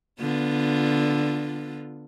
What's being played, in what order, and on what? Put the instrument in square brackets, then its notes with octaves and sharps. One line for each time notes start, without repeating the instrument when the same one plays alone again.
[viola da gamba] D3 B3 F4